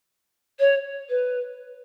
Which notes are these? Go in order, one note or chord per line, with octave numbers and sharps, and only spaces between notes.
C#5
B4